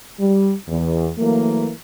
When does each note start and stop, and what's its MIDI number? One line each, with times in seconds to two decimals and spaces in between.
0.20 0.53 55
0.68 1.09 40
1.18 1.70 52
1.18 1.70 54
1.18 1.70 57
1.18 1.70 58